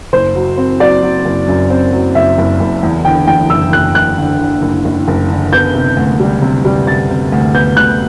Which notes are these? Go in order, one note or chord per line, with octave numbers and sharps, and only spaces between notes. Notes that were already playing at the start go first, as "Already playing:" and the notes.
F#1 C5
F#3
C4
F#3 D5
F#3
F#1
F#2
C4
F#3
F#1 E5
F#1
F#1
E2
D3 G5
E2 G5
F#1 E6
F#1 F#6
F#1 F#6
D3
D3
F#1
F#1
F#1
D3
B3 G6
C3
D2
G3
C3
G3
C3 A6
C3
D2
B3 G6
D2 F#6